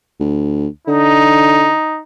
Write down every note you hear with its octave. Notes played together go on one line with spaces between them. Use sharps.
D2
D3 D#4